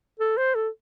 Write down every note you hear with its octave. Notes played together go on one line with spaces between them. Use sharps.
A4
C5
A4